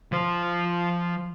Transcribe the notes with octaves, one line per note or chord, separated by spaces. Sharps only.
F3 C5